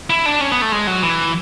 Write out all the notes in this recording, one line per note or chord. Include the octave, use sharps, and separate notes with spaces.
E4
D4
C#4
B3
A3
G#3
F#3
E3